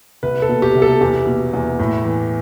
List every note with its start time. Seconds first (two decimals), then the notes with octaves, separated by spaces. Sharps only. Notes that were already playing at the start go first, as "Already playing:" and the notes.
0.23 C2 B4
0.42 A4
0.49 B2
0.62 G4
0.75 C2
0.82 A4
1.01 E2 G4
1.27 B2
1.53 E2
1.79 A2
2.05 E3